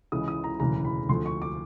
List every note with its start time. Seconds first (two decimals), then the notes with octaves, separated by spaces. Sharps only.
0.12 C#2 C#3 E3 G#3 D#6
0.28 D#6
0.44 A#5
0.60 E1 D2 C#3 E3 A#5
0.85 B5
1.09 D2 D3 F3 C6
1.26 C#6
1.42 D6